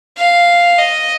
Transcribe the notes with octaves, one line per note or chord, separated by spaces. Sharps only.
F5
D#5